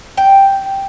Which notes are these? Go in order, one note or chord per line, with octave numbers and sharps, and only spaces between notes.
G5